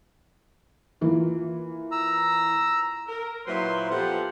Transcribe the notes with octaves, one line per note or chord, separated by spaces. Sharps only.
E3 A#3 F4
A#5 E6
A#4
A#2 F#3 E4 B4 C5 C6
F3 B3 G4 A4 C5 F#5